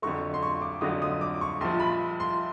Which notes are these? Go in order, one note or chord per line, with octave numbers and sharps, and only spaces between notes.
F2 D3 F#3 A3 C#6
C6
C#6
D6
F2 D3 F#3 A3 D#6
D#6
D6
C#6
A#1 A#2 F3 C6
B5
C6